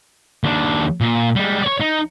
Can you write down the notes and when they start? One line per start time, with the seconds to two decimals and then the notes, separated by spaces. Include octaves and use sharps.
0.44 D#2 D4
1.01 A#2
1.36 G3 G#3
1.62 C#5 D5
1.80 D#4